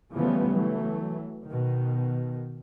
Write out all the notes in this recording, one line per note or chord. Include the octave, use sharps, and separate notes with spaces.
C#3 E3 F3 G3 A3 B3
E3 F#3 A3
B2 D#3